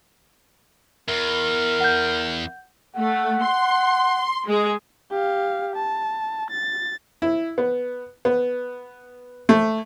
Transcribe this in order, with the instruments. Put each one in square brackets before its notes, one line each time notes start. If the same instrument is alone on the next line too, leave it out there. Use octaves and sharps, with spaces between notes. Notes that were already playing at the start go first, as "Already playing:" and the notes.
[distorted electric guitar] E2 [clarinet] A#4
[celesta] F#5 G6
[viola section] A3 [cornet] F#5
[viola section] C6
G#3 G#4
[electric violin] G4 F5
A5
A6
[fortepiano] E4
B3
B3
A3